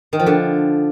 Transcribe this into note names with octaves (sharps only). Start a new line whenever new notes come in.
D#3
F3
D3